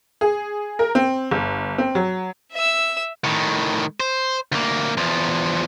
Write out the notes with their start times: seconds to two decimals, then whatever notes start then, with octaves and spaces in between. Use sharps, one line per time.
0.21 G#4
0.79 A#4
0.95 C4
1.31 G1
1.78 C4
1.95 F#3
2.52 E5 E6
3.24 A2 D#3
4.00 C5
4.52 D2 A#3
4.97 E2 F3